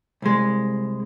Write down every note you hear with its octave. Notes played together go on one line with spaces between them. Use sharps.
C2 G#3